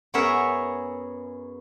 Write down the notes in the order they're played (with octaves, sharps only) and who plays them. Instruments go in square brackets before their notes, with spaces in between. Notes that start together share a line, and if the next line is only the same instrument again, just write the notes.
[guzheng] F#2 B3 G#4 A#4 C#5 E5